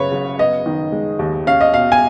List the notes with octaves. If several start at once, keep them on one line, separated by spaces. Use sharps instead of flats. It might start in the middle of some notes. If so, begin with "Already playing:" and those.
Already playing: F#2 C#3 B4 C#5
F#1
B3 D#5
D#3
G#3
D#2
C#4 F5
D#5
B2 F5
G#5